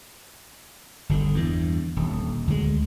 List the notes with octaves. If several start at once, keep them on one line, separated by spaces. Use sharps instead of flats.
G1 D3
E2 G2
D#1
D2 G#3